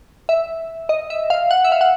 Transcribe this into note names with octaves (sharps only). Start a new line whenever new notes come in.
E5
D#5
E5
F5
F#5
E5
F5
F#5